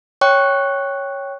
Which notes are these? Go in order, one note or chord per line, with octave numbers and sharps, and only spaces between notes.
C#5 G5 C#6 F#6